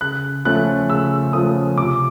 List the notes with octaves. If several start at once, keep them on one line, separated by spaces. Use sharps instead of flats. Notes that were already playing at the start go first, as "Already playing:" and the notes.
C#3 F#6
F3 A3 C#4 F#6
C#3 E6
F3 A3 C#4 D#6
C3 D6